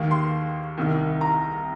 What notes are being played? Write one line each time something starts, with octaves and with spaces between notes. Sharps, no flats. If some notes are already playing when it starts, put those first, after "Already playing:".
Already playing: D#2 D#3 A#3
C6
C2 C3 D#3
A#5